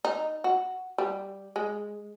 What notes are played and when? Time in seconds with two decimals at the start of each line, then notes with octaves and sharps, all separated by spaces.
0.05 D#4
0.44 F#4
0.98 G3
1.56 G#3